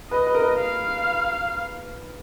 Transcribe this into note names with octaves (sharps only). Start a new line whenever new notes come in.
B4 D#5
B4
A#4
B4
F5